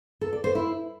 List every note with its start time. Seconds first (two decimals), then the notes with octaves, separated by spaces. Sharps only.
0.21 A4
0.33 D5
0.44 C5
0.55 E4